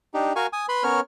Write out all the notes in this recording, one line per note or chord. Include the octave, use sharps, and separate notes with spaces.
D4 D#4 G4
F#4 A#4 F5 G#5 C#6
G#5 D#6
B4 B5 C6
B3 C#4 A#4 C#5 F6